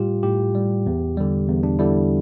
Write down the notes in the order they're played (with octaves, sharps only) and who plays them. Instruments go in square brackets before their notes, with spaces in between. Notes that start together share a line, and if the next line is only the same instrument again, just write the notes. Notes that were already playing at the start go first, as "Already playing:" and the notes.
Already playing: [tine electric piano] A2 G3 F4 G4
A2 G4
G3
E2
D3 G3
E2
D4
D3 G3 E4